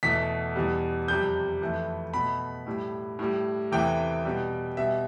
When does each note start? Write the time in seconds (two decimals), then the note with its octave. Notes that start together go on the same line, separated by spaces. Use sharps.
0.03 E2 B2 A3 B6
0.56 E2 B2 G3
1.08 F2 C3 G3 G6
1.62 F2 E3 A3
2.14 B2 A3 B5
2.67 A2 G3
3.19 A2 G3
3.72 E2 C3 E3 A3 G5
4.25 B2 G3
4.77 B2 G3 E5